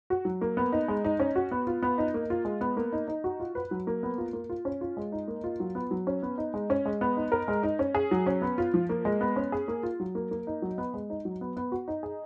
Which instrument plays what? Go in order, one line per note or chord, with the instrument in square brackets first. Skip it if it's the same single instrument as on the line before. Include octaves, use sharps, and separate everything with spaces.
[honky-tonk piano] F#4
F#3
A#3
B3
D#4
G#3
D#4
C#4
F#4
B3
F4
B3
D#4
A#3
F4
G#3
B3
A#3
D#4
D#4
F#4
F4
B4
F#3
A#3
B3
F4
A#3
F4
C#4
F4
G#3
D#4
A#3
F4
F#3
B3
F#3
C#4
B3
D#4
G#3
C#4
G#3
B3
D#4
A#4
G#3
D#4
C#4
G#4
F#3
C#4
B3
F4
F3
A#3
G#3
B3
C#4
G#4
A#3
F4
F#3
A#3
A#3
D#4
F#3
B3
G#3
D#4
F#3
B3
B3
F#4
D#4
G#4